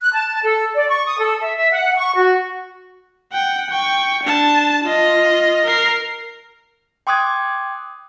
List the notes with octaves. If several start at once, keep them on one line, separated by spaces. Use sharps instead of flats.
F#6
A5
A4
D5
C#6
D#6
A4
E5
E5
F#5
C#6
F#4
F#5 G5
G5 C#6
D4 A5
F4 D#5
A#4 C7
G5 C6 D6 D#6 F#6 G#6